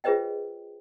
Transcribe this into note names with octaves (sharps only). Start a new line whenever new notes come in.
F4 G#4 B4 C5 D#5 G5